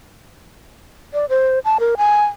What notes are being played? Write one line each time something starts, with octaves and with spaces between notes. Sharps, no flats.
D5
C5
A5
A#4
G#5